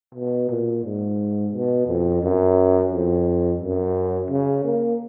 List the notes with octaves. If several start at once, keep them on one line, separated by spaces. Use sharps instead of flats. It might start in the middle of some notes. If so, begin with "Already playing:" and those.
B2
A#2
G#2
B2
F2
F#2
F2
F#2
C#3
A#3